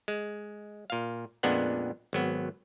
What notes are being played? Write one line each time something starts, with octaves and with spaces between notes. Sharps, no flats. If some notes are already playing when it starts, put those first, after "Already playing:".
G#3
A#2 F5
F2 A#2 G#3 B3 D4 F#5
G#1 F#3 B3